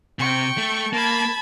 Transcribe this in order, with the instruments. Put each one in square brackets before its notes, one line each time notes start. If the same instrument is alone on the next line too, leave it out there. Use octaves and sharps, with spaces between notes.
[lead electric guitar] C3 [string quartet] G5 C#6
[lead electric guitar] A3
[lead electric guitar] A#3 [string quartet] A5 B5 G#6